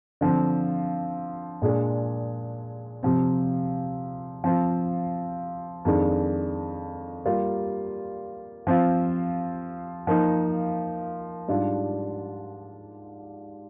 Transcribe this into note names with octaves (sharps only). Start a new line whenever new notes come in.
D3 F3 C4
A#2 G#3 D4 G#4
C3 F3 C4
F3 C4 F4
F2 D#3 G#3 D4
G3 A#3 F4
F3 C4 F4
F3 A#3 D#4
G#2 G3 D4 F4